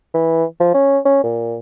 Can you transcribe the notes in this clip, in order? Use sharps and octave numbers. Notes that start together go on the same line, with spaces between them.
E3
F3
C#4
C#4
A#2